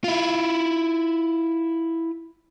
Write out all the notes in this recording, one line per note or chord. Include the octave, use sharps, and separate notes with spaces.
E4 F4